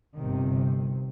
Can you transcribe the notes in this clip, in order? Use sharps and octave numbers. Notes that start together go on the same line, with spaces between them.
G1 C3 D#3